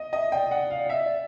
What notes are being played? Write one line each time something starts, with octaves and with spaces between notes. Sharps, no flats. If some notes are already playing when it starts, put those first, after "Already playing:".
Already playing: D#5
D#5 E5
D5 G5
F#5
F5
D5
D#5 E5
D5